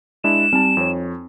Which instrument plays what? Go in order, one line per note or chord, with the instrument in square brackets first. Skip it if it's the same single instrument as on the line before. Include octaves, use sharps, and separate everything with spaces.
[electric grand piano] G#3 D4 E4 [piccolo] E7
[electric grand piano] G3 A5 [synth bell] C4
[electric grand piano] F2 C#5